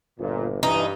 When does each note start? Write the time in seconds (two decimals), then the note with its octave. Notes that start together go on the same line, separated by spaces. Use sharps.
0.19 G1 A#2
0.63 G2 E3 D#4